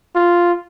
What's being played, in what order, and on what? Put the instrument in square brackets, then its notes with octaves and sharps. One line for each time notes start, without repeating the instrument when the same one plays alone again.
[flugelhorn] F4